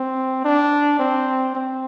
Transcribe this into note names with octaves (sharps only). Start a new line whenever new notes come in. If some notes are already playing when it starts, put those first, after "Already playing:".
Already playing: C4
D4
C4
C4